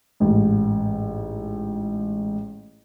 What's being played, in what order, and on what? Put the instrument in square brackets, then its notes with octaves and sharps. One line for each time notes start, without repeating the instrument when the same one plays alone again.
[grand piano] A1 G#2